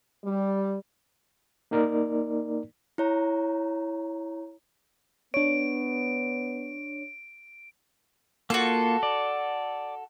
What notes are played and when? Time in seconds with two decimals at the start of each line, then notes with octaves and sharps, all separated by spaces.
0.25 G3
1.71 A#3 D#4 A#4 D5
2.98 E4 C#5 A#5
5.34 B3 D4 C#5 D7
8.50 A#3 F4 F#4 A4
9.03 D5